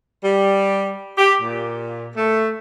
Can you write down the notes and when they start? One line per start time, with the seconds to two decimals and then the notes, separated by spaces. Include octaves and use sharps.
0.23 G3
1.18 G4
1.40 A#2
2.16 A3